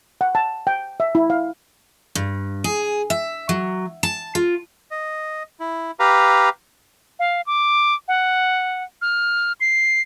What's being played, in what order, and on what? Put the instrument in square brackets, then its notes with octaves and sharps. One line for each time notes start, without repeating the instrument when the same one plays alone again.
[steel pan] F#5
A5
G5
E5
E4
F5
[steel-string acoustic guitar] G2
G#4
E5
F#3
A5
F4
[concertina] D#5
E4
G4 B4 F5 A#5
[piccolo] F5
D6
F#5
F6
C7